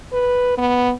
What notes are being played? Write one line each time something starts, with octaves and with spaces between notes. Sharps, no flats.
B4
B3